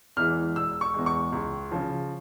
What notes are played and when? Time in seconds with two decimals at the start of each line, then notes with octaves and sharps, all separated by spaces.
0.17 E2 E3 G#3 F6
0.56 E1 E6
0.81 C#6
0.94 E2 E3 G#3
1.06 C#6
1.32 C#2
1.72 C#3 F3